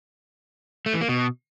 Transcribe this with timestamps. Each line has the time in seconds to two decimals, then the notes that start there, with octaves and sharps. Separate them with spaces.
0.86 A3
0.94 E3
1.01 A#3
1.09 B2